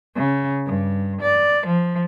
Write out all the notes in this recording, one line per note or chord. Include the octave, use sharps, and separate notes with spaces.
C#3
G2
D5
F3